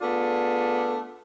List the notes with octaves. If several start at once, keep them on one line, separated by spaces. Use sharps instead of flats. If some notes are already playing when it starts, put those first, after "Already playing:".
A3 B3 D4 F4 G#4